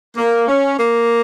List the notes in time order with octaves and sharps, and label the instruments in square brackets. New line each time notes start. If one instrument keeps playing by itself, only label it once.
[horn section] A#3
C#4
A#3